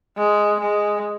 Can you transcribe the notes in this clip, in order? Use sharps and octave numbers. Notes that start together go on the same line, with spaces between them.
G#3
G#3